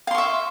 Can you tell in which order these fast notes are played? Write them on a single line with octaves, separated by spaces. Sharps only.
F5 C6 C#6 E5